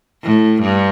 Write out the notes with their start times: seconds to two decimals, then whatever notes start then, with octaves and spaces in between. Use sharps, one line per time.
0.23 A2
0.61 G2